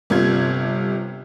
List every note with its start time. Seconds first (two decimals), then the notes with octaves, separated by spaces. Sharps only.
0.10 G1 C3 F4 G#6